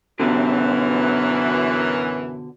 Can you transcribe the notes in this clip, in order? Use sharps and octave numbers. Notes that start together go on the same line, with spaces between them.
F#2 B2 D3 E3